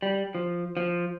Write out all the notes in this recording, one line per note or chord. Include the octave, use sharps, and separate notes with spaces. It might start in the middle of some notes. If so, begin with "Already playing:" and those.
G3
F3
F3